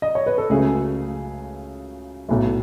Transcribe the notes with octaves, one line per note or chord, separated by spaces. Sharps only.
D#5
C#5
B4
A4
C#2 C#3 F#3 A3 G#4
B1 A2 F#3 A3